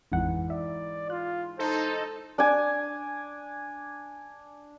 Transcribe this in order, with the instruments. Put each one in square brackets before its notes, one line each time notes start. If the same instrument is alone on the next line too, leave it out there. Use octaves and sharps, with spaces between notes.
[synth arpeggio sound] A1 F2 F#5 [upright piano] G#2 E3
[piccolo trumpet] D5 [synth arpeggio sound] E5
[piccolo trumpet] F4 [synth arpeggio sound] F#6
[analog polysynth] D#4 A4 [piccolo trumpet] C5
[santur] D4 G#5